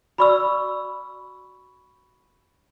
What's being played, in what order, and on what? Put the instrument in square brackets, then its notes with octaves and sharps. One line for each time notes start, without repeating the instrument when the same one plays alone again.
[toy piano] F#4 D5 E6 [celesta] B5 C#6